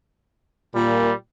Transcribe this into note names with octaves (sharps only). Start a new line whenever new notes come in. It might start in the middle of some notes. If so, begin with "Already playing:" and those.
A#2 G3